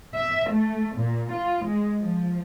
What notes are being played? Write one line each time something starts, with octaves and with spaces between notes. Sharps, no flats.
E5
A3
A#2
F4
G#3
F3